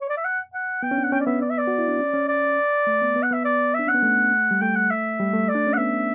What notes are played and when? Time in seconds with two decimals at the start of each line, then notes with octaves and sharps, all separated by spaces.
0.02 C#5
0.09 D5
0.17 E5
0.25 F#5
0.54 F#5
0.83 B3 G5
0.91 C#4
0.97 D4
1.04 F#5
1.12 C#4 G5
1.20 D5
1.26 B3 E5
1.41 D5
1.50 E5
1.58 D5
1.67 F#4
1.78 E4
1.89 D4
1.99 C#4
2.14 C#4
2.29 D5
2.87 A3
3.02 B3
3.16 B3
3.23 F#5
3.31 B3 E5
3.45 D5
3.74 E5
3.79 D4
3.87 C#4 F#5
3.95 B3
4.03 A3
4.51 G3
4.61 A3 G5
4.76 F#5
4.91 E5
5.20 G3
5.33 A3
5.48 D5
5.55 D4
5.67 C#4
5.74 F#5
5.78 B3 E5